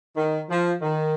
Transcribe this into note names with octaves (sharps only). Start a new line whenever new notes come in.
D#3
F3
D#3